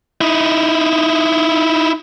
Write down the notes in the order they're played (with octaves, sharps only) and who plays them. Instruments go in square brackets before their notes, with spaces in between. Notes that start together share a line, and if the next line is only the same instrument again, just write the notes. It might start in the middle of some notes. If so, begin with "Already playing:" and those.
[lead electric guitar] D#4 E4